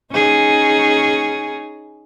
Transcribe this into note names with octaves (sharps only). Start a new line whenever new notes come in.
C#4 D#4 G#4